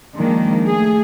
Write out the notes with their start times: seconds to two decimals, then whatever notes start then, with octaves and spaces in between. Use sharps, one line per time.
0.14 D#3 F3 G#3 A#3 D4
0.67 A3 G#4